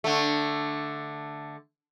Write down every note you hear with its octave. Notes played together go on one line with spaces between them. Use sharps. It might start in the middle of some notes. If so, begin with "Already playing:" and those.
D3 A3